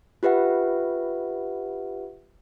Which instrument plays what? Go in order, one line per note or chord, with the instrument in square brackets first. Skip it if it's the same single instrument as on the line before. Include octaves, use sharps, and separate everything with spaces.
[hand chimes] F4 G4 B4 E5 F#5